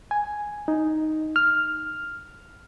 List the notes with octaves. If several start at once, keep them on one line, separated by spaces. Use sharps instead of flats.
G#5
D#4
F6